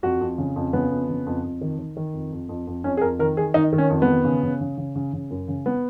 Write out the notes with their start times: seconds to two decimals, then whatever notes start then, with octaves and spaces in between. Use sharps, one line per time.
0.03 F2 F#4
0.21 F2
0.38 C#3
0.56 F2
0.73 C#3 B3
0.91 F2
1.09 C#3
1.26 F2
1.44 F2
1.61 D#3
1.79 D#3
1.97 D#3
2.13 F2
2.32 F2
2.49 F2
2.67 F2
2.84 F2 C#4
2.97 G#4
3.01 F2 A#4
3.19 D#3 A#4
3.37 D#3 G#4
3.54 D#3 D#4
3.73 D#3
3.78 C#4
3.90 F2
4.02 B3
4.07 D#3
4.24 C#3
4.43 C#3
4.61 C#3
4.77 C#3
4.95 C#3
5.13 C#3
5.30 F#2
5.48 C#3
5.66 B3